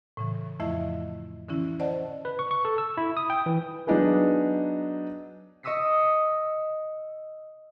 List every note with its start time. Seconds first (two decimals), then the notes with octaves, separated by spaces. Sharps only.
0.17 A2 C#3 E3
0.60 F2 F3 A3 E4 D#5 E5
1.49 D3 E3 C#4 E4
1.80 C5 D5 D#5 F#5 A5
2.25 B4
2.39 C#6
2.51 C#6
2.65 A4
2.78 E6
2.97 E4
3.17 D#6
3.30 G5
3.46 E3
3.87 F#3 B3 D4 D#4 G#4 B4
5.63 D#5 C#6 D#6 E6 B6 C7